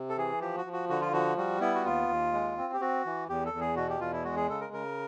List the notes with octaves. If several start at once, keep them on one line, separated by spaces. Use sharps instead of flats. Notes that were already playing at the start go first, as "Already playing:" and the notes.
Already playing: C3
A4
E3 G#4
F3 G4
F#4
F3
F#4
D3 F#4
F4
F3 F#4
G3 F#4
B3 E4
F#4
D#2 F4
D#2
G#3
C4
G4
C4 F#4
E3
E2 G4
A4
E2
G#4
B2 F#4
G4
E2 F4
E4
G#3 F#4
G#4
C#3 A4
A#4
C#3 A#4